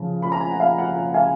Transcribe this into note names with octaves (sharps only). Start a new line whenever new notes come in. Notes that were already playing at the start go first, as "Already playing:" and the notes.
Already playing: C#3 F3
B5
A#5
G#5
F#5
F5
F#5
F#5
F5 G#5